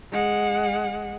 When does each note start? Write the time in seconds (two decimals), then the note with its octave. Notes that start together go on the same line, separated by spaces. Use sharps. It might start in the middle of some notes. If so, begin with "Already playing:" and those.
0.12 G#3 F#5